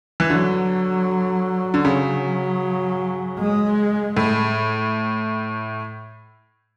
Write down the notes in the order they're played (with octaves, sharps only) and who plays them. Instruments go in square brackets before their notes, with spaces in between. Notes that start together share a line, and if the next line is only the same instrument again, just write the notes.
[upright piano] E3
[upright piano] D3 [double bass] F#3
[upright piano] D3
[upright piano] C#3 [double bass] F#3
[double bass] G#3
[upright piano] A2